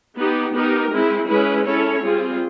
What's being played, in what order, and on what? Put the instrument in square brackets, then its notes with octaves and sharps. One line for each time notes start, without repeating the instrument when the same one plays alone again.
[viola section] B3 D#4 G4
B3 D#4 G4 A#4
G#3 C4 E4
G#3 C#4 E4 G#4 B4
C#4 E4 A4 C#5
G3 C4 F4 G#4